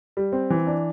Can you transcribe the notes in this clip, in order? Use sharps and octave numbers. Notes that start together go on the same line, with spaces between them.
G3
C4
E3
D4